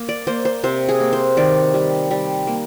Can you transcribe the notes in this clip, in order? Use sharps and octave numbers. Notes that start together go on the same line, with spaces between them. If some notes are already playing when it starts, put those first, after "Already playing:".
Already playing: A#3
D5
A#3 C5
C5
C3 C5
G#4
A#3
C5
D#3 D5
G3
G3
A#3